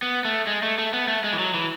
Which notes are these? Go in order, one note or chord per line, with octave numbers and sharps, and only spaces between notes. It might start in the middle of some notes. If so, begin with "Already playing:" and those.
B3
A3
G#3
A3
A3
B3
A3
G#3
E3
F#3
E3